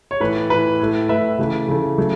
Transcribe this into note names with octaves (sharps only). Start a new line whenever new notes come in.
C#5
A2 E3 A3 B4
A2 E3 A3 B4
A2 A3
A2 A3 B4 E5
C#3 E3 A3
C#3 E3 A3
C#3 F#3 A3